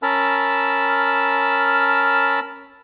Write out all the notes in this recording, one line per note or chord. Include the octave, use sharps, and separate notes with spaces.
C#4 A#4 A5 B5 E6 F6